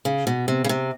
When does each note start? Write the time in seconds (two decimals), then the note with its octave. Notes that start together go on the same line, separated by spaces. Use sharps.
0.05 C#3
0.27 B2
0.48 C3
0.64 C#3
0.69 C3